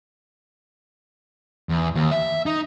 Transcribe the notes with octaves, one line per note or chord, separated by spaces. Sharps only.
E2
D#2
E5
D#4